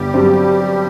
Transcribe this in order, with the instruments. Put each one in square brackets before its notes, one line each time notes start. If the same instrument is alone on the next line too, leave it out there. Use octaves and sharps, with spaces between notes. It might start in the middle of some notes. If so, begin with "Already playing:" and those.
Already playing: [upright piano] G1 [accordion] G3 G4
[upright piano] G2 F#3 C4